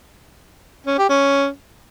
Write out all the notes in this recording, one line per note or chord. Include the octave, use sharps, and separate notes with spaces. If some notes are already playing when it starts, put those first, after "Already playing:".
C#4
G4
C#4